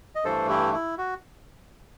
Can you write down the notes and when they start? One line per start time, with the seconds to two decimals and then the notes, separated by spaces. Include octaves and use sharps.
0.15 D#5
0.24 G2 E3 A3 A4 C5
0.49 E4 G4
0.73 E4
0.98 F#4